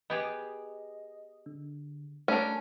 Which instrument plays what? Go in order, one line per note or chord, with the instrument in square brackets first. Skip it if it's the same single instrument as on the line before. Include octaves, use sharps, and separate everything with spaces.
[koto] B3 G4 G#4 [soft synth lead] D#5
[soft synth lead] D3
[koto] G3 D4 A#4 [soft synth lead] A3 [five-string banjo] C#4